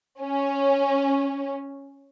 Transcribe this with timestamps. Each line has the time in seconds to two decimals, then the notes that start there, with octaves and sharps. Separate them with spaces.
0.21 C#4